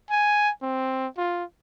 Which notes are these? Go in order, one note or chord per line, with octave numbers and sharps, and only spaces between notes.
G#5
C4
F4